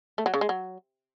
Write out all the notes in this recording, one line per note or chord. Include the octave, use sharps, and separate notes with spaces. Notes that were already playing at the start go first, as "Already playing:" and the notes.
A3
F#3
C#3
G#3
F#3